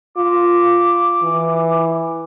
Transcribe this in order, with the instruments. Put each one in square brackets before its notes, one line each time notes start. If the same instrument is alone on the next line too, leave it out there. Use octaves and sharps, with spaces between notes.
[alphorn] F4 [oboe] D6
[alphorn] E3